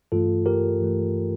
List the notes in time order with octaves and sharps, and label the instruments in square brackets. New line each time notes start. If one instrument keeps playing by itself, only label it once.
[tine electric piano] G2 E3 A3 F4 A4
G4 A#4
G2 E3 A3